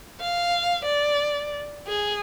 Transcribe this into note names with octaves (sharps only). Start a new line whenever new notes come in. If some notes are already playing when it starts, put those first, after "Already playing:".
F5
D5
G#4